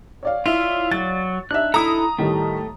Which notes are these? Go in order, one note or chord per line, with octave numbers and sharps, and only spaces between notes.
C#5 D5 F5
E4 F4
F#3 A6
D4 D#4 E5 F#6
E4 A4 A#5 D#6
A2 D#3 G3 A3